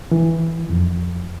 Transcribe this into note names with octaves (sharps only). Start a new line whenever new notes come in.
E3
F2